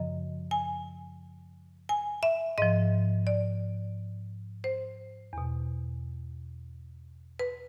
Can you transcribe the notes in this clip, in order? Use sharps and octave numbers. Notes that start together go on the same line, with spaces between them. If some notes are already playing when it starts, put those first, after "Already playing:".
Already playing: F#2 C#3 F3 D#5
G#5
G#5
E5
G#2 F3 D#5
D5
C5
E2 B2
B4